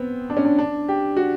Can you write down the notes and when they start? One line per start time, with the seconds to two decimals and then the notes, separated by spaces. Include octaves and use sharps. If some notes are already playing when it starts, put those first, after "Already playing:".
Already playing: B3 C4
0.30 D4
0.37 C#4
0.45 D4
0.59 D4
0.88 G4
1.17 F#4